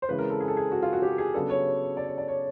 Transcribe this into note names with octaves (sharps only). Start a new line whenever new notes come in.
C5
C#3 E3 G#3 C4 B4
A#4
A4
G#4
A4
G#4
F#4
F4
F#4
G4
G#4
C#3 F#3 B3 D4 A4
C#5
D5
C#5
D5
C#5